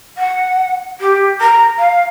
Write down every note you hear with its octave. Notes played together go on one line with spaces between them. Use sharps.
F#5
G4
A#5
F5